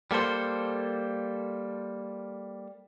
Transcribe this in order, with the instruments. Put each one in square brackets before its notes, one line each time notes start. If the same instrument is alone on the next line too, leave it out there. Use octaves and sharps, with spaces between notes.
[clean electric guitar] G3 A#3 A4 C5